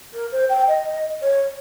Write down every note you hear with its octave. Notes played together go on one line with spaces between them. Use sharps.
A#4
C5
G5
D#5
C#5